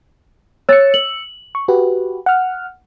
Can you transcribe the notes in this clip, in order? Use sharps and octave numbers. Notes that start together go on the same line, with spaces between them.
C#5 E6 A6 C#7
F#7
C#6
F#4 G4 B4
F#5 F6